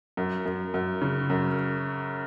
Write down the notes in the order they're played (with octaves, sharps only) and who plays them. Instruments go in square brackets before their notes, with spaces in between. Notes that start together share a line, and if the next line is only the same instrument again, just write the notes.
[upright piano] F#2
F#2
F#2
C#3
F#2